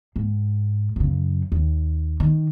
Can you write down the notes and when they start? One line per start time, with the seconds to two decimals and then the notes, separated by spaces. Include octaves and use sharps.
0.16 G#2
0.96 F#2 C#3
1.52 D#2
2.20 D#3